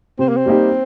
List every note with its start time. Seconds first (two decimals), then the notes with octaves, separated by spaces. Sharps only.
0.19 C3 C4
0.29 A#3
0.37 C4
0.46 G3 A#3 D#4 G4